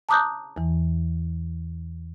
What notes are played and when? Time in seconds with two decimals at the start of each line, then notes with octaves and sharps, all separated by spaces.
0.09 A5 A#5 D6 D#6 F#6 G6
0.56 E2 E3